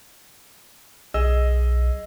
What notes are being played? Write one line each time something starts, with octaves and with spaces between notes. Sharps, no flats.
B1 G#4 D#5 E6